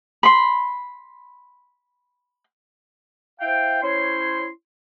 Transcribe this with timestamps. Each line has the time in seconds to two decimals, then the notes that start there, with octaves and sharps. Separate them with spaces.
0.23 B5 C6
3.40 E4 C5 F5 G5
3.82 C#4 E4 C5 C#5 C6